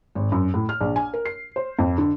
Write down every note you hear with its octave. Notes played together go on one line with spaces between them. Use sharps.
G#1
F#2
A2
F6
A#1
G#5
A#4
C7
C5
F2
D3